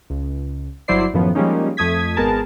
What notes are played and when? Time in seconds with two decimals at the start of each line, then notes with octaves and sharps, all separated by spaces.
0.10 C#2
0.88 G1 F#3 E4 C5 D5 C7
1.14 F#2 A2 D#3 F3 B3
1.35 F3 G3 G#3 A#3 C#4 D#4
1.77 F2 A3 D#6 G#6 B6
2.17 G#1 G#3 B3 G#4 A#4 A5